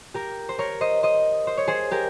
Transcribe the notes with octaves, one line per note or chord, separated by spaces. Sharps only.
G4 A#4
C5
A#4 C#5
C5 D#5
C5 D#5
C5
C#5
G#4 C5
G4 A#4